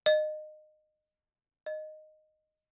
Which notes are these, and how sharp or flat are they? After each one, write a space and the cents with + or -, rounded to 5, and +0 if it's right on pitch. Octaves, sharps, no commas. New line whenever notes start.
D#5 -25
D#5 -10